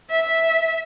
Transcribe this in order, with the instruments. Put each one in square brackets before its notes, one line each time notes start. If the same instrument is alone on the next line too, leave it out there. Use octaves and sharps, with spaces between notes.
[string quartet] E5